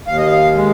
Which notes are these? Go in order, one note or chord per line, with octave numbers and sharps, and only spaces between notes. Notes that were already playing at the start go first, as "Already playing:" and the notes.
D#2 F5
D#5
F5
G#3